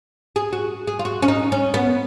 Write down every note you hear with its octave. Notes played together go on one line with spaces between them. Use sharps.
G#4
F#4
G#4
F4
F#4
C#4
D#4
C#4
B3